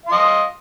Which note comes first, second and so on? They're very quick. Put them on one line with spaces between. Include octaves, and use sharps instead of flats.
F5 C6 D#5